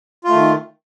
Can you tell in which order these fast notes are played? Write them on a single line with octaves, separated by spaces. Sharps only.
F4 A3 D#3